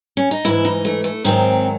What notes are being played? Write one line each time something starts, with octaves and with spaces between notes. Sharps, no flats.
C#4
D#4
G#2 E3 E4
D#4
A3
A3
G#2 D#3 F#3 C4